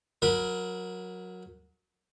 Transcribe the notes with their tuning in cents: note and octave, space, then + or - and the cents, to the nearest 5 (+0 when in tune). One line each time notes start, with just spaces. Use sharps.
F#3 -20 A#4 +0 B5 -10